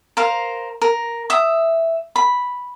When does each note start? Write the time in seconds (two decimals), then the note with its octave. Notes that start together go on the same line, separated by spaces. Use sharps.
0.17 A#4 C5 F5
0.82 A#4
1.30 E5 D#6
2.16 B5